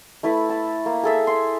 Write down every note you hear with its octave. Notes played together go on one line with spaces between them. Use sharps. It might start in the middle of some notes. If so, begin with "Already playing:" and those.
A3 E4 B4
A5
A#3
G#4 A4 E5
C6